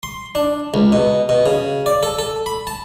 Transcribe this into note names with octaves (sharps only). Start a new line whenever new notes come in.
C6
D4
C#2
B2
B2
C#3
D5
A4
A4
B5
A5